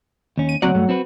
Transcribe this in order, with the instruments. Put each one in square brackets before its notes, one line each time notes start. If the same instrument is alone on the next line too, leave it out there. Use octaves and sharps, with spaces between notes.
[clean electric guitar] D#2 C#4
[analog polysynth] D#7
[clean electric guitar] D2 C4 D5 [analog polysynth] F#3 F#5
[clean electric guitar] G2 A3
C4 F#4 B4